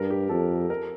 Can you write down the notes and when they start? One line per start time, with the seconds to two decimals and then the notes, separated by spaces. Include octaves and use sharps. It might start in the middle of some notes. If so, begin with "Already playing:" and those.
Already playing: G2 A#4
0.10 G4
0.29 F2 A4
0.70 A#4